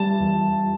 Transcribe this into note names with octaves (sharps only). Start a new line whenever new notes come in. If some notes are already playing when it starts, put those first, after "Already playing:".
Already playing: G3 A5
E2